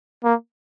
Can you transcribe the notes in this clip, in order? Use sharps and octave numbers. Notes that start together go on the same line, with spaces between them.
A#3